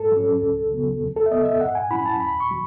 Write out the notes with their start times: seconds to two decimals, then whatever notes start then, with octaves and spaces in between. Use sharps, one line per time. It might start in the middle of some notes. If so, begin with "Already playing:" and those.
Already playing: G#2 A4
0.12 F#3 C#4
0.42 C#2
0.72 C#3 F#3 B3
1.01 D#2
1.16 A4
1.26 E5
1.31 C#3 F#3 B3 D#5
1.45 E5
1.60 G#2 F#5
1.75 G#5
1.91 F#3 C#4 E4 B5
2.06 A5
2.20 D#2 B5
2.40 C#6
2.50 D#3 F#3